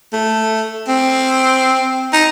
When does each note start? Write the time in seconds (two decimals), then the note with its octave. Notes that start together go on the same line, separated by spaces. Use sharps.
0.13 A3
0.88 C4
2.13 D#4